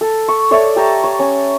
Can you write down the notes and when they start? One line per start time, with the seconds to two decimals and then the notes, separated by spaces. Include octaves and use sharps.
0.01 A4
0.28 C#6
0.51 A4 C#5 D5 E5
0.76 G4 A5 A#5 C#6
1.04 C#5
1.19 C#4